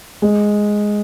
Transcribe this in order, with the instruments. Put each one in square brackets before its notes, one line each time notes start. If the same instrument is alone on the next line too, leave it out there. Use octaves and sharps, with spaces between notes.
[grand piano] G#3